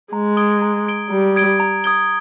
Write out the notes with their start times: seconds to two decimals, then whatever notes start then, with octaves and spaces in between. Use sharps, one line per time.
0.13 G#3 A#5
0.37 D#6 G#6 D7 G7
0.62 A#5
0.86 D#6 G#6 D7 G7
1.10 G3 A#5
1.36 D#6 G#6 D7 G7
1.60 A#5
1.84 D#6 G#6 D7 G7